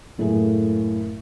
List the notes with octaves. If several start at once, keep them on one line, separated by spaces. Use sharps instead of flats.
F#1 A2 A3 A#3 G#4